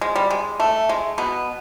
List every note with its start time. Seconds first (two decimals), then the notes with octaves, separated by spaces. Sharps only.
0.01 G#3
0.16 G3
0.31 G#3
0.60 A3
0.89 G#3
1.18 B2 B3